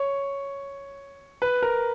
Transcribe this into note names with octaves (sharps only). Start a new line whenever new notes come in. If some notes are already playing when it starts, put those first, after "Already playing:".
Already playing: C#5
B4
A#4